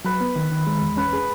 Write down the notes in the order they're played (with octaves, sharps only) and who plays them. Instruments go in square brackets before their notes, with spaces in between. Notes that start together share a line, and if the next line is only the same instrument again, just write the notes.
[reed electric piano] F#3 [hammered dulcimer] B4
[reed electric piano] B3
D#3
D#3
G#3
E2
[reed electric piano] C#4 [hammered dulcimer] B4
[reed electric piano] G#4